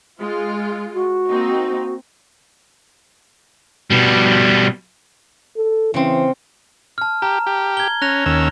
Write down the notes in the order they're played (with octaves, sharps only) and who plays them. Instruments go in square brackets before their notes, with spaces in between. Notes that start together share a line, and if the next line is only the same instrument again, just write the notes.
[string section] G#3 F4
[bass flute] F#4
[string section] A#3 C4 D#4
[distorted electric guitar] B2 G3
[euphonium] A4
[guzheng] C#3 C4 [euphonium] E3
[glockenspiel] A5 F6
[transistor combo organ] G4 [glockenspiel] A#5
[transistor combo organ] G4
[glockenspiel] G#6 G7
[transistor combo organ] C#4 [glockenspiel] F#6 A#6 F7
[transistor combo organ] D#2 C#4 E6